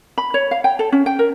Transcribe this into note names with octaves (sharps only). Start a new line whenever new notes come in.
B5
C#5
F5
G5
A4
C#4
G5
A#4